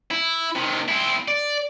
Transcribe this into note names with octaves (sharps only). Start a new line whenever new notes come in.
E4
C3 D#3
C4 E4
D5